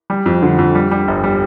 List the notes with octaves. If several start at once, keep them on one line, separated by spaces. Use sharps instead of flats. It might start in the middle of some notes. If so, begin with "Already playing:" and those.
G3
F2
D3
F2
G3
G3
G1
G3